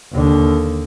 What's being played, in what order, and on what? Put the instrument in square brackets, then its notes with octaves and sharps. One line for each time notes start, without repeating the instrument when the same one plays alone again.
[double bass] D#2 D3